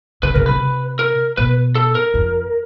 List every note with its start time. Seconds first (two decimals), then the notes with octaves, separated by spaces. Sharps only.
0.23 C#3 B4
0.34 C#3 A#4
0.46 C3 B4
0.99 A#4
1.37 B2 B4
1.75 A4
1.95 A#4
2.14 F2